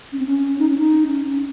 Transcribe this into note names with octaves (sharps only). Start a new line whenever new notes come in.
C#4
C4
C#4
D#4
C#4
D#4
C#4
C#4